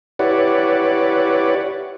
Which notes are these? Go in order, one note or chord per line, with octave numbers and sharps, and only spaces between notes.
E4 G4 B4 C#5 D5 F#5